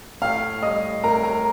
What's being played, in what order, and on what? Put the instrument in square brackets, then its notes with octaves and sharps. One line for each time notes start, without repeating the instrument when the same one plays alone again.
[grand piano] A2 F5 F6
G3 D#5 D#6
A2 A#4 A#5
A#4 A#5